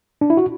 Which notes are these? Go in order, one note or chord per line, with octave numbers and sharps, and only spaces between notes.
D4
E4
F#4